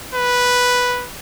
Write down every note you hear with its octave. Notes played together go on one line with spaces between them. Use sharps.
B4